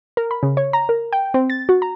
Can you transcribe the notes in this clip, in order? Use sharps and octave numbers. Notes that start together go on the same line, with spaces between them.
A#4
B5
C#3
C#5
A#5
A#4
G5
C4
A6
F#4
A#5